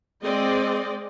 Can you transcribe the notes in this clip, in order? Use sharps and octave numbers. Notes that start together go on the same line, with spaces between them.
G#3 C4 D5 D#5